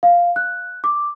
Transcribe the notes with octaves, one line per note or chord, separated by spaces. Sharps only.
F5
F#6
D6